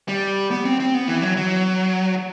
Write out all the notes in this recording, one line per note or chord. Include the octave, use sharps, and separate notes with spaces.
G3
B3
C4
C4
B3
E3
F#3
F#3